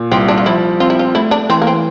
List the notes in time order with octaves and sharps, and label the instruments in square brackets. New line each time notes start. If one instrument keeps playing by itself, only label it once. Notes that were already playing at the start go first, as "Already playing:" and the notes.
Already playing: [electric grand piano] A#2
[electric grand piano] C2 [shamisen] C4
[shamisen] D4
F4
[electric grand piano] F3 [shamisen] E4
[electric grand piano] C4 [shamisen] F4
[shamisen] E4
F4
[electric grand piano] A3 [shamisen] E4
[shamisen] D4
[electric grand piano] E3 [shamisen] C4
[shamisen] A#3
C4